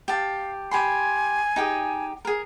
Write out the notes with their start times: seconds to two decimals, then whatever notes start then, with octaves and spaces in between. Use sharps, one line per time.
0.08 G4 F5 A5
0.71 G4 G#5 B5 C6
1.56 D#4 G4 G#4
2.25 G#4 A#4